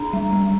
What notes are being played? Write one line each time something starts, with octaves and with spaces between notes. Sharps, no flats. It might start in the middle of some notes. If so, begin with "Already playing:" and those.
Already playing: D4 A#5
G3
G3